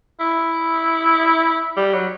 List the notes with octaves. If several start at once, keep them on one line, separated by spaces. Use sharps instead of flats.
E4
G3
F#3